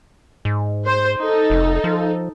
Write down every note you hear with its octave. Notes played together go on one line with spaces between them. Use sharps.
G#2
C5
D#4 A4
F1
F3